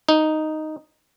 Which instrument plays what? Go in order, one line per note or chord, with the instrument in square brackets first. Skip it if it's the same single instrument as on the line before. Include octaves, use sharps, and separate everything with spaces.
[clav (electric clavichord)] D#4